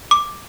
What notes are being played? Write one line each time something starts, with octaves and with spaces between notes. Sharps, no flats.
D6